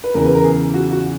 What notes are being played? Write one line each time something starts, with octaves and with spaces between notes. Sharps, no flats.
B4
E2 C#3 E3 A#4
B4
A#4
G#4
F#4
F#4